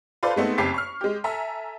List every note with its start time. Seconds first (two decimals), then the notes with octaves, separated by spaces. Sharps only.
0.23 F4 A4 B4 C5 D5 F5
0.36 G#3 A3 B3 C4 D#4
0.58 F#1 F2 G4 D6 B6 C7
0.74 C#6 F6
1.01 G#3 G4
1.24 A4 E5 G#5 A#5